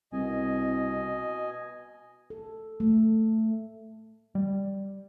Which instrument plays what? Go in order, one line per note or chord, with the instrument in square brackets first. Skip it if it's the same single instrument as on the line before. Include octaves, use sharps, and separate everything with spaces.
[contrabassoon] C2 [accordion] B2 D#5 G#5
[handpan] A4
A3
[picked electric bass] G3